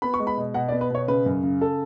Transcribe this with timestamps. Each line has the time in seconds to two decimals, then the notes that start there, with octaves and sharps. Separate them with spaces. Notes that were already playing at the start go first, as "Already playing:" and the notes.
0.02 B3 B5
0.14 C#6
0.20 G#3
0.27 B5
0.37 B2
0.54 B2 F#5
0.68 D5
0.72 B3
0.81 B4
0.90 B2 C#5
1.08 C#3 B4
1.26 F#2
1.43 C#3
1.61 A4